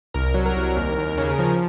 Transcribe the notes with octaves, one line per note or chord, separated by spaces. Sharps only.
C2 A#4
F#3
A#4
C2
D#2
D#2
C#3
F3